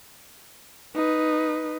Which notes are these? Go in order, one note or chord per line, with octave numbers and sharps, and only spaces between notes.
D#4 B4